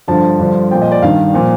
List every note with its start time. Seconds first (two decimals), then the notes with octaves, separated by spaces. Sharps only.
0.08 G2 D3 F3 A5
0.39 G2 D3 F3
0.71 A#2 F3 G5
0.82 D#5
0.92 D5
1.02 G2 D#3 F5
1.34 A#2 F3